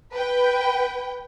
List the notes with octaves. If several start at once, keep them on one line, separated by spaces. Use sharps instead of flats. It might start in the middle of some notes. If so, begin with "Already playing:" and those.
B4 G5